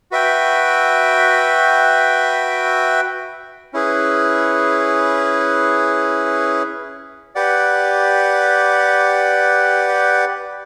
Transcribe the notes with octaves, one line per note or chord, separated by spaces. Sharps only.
F#4 B4 E5 G5
C#4 E4 G#4 B4
G4 B4 D5 F#5